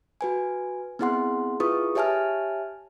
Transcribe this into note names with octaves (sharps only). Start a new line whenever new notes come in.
F#4 B4 G#5
B3 C4 E4 G#4 F#5 C6
E4 F4 G#4 B4 C#6 D#6
G4 C#5 E5 G#5 A5 F6